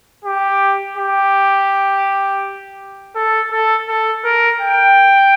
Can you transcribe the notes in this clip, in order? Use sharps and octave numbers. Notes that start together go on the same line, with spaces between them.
G4
G4
A4
A4
A4
A#4
G5